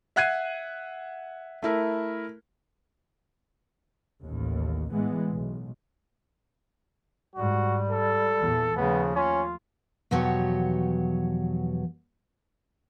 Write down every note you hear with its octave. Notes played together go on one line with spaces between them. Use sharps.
E5 F#5 F#6 G#6 C7 D#7
A3 E4 A#4
A1 D#2
A2 E3 G#3 B3
B1
G#2 G3 F#4
A4
E2 A#2 E3
D#2 C#3 F3 A3 B3
C#4 F4
E2 B2 F3 F#3 G4 C#5